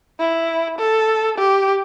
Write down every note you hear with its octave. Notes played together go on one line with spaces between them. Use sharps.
E4
A4
G4